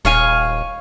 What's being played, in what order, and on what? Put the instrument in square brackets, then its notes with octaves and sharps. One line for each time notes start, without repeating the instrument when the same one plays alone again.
[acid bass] D#1 [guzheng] C#5 F5 G#5